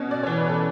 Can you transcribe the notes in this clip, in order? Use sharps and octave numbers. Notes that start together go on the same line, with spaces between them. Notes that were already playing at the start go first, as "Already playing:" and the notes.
Already playing: B2 C#4
D5
E3 C#5
B4
A4